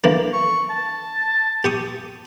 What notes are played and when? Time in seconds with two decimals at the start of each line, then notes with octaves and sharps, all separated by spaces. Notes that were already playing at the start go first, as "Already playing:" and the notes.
0.04 D3 E3 A#3
0.33 C#6
0.70 A5
1.64 G4 C#6 D#6